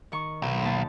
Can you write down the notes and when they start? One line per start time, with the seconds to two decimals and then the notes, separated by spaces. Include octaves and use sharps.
0.12 D#3 C#6
0.42 B1
0.62 D#2 A5